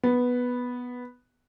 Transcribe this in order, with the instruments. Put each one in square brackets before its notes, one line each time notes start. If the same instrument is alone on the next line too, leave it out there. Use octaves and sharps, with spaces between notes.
[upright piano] B3